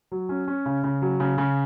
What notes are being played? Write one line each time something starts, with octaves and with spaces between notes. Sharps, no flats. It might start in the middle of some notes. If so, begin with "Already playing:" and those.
F#3
C#4
C#4
C#3
C#3
F#3
C#3
C#3